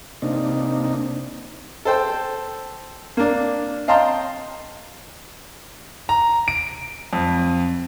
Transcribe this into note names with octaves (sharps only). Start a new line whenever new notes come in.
C3 A#3 D4 D#4
A4 C5 G5
A#3 D4
D#5 F5 G5 A5 A#5 C6
A#5
D7
F2